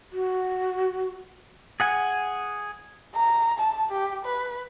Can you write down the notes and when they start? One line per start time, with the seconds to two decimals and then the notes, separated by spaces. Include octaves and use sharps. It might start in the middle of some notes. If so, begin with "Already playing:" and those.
0.12 F#4
1.80 G#4 F#5 G#5
3.16 A#5
3.59 A5
3.92 G4
4.25 B4